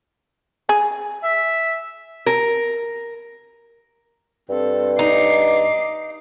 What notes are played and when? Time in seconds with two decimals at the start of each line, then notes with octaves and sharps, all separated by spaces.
0.69 G#4
1.23 E5
2.26 A#4
4.49 G2 C4 A4
4.99 D#4 D6 C7